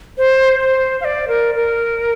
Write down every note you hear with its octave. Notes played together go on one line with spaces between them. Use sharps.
C5
C5
F5
D5
A#4
A#4